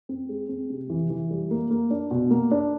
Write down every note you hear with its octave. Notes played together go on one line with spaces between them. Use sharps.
C4
G#3
C4
C3
E3
E3
G3
A#3
A#3
D4
B2
A#3
D4